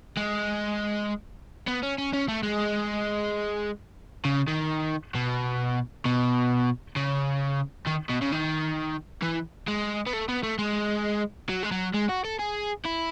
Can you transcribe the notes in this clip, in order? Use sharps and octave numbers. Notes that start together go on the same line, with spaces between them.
G#3
B3
C#4
C#4
C#4
A3
G#3
C#3
D#3
B2
B2
C#3
D#3
B2
C#3
D#3
E3
G#3
B3
A3
B3
A3
G#3
F#3
G#3
F#3
G#3
F#4
A4
G#4
E4